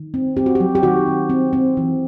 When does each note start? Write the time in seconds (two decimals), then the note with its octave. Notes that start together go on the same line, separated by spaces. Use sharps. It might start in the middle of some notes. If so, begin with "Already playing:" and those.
Already playing: D#3
0.14 C4
0.37 C4 G4
0.46 F#4
0.55 G4
0.60 F#3
0.75 G4
0.83 D#3 F#4
1.07 C4
1.30 C4
1.53 C4
1.77 E3